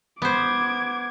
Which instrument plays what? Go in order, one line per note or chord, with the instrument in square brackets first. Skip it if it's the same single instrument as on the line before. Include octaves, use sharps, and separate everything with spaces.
[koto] B3 C5 [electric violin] D6 G#6